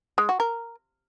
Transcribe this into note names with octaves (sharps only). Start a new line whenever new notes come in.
G#3
F#4
A#4